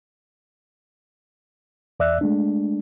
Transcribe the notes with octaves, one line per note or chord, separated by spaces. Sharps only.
E2 D5 E5 E6 F#6
G#3 A3 D4